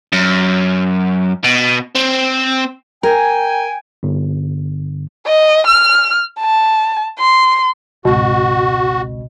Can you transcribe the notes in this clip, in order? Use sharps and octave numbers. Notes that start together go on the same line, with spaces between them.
F#2
B2
C4
A#4 G5 G#5
G1
D#5
F6
A5
C6
G#1 C#2 B2 F#4